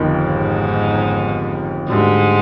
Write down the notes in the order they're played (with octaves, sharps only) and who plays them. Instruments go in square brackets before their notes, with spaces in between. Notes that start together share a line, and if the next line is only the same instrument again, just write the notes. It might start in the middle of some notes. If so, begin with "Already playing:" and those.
Already playing: [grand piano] G1 F2 D#3
[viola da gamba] G#2
[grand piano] D2 D3 G3 [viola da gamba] G#2